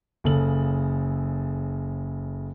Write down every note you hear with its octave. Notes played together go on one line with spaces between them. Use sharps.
F#1 C#3 A4 F#7